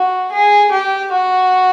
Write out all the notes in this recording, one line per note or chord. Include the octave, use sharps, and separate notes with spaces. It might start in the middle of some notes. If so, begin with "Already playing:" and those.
Already playing: F#4
G#4
G4
F#4